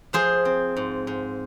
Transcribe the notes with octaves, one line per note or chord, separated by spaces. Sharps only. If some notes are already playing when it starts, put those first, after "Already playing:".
F3 G#4 C5
C4
G#2
G#2